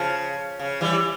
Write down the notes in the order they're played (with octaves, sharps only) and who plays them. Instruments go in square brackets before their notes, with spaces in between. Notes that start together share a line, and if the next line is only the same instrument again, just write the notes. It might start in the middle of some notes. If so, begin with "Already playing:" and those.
Already playing: [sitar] C#3 [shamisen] F3
[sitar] C#3
E3 G3